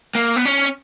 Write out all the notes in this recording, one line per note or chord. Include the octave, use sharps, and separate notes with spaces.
A#3
B3
C#4